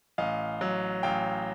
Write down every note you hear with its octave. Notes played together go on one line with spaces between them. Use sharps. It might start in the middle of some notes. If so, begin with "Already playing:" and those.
A1 D#5 F5
F#3
A1 F5 G5